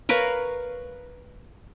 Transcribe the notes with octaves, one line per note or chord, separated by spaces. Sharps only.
A#4 B4 C#5 F5